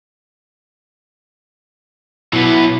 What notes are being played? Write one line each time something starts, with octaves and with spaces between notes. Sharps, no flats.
B1 B2 F#3 B3 E4